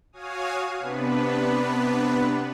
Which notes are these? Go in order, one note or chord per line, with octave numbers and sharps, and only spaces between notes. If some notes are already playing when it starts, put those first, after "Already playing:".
F#4 C#5 F5 G#5 D#6
C3 B3 D4 B4